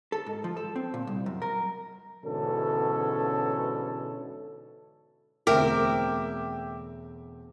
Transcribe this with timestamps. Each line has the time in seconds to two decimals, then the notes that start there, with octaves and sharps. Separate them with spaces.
0.12 A4
0.26 G#2
0.44 F3
0.57 A4
0.76 C4
0.94 A#2
1.07 C2
1.26 F#2
1.42 A#4
2.24 G#2 B2 D3 E3 C#4 A4
5.47 E1 D2 C4 A#4 E5 G5 D6